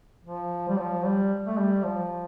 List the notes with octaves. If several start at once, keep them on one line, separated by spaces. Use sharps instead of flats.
F3
G3
F3
G3
A3
G3
F3